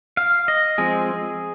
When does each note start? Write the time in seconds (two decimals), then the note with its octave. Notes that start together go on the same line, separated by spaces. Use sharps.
0.17 F5
0.48 D#5
0.78 F3 G#3 C4 G#4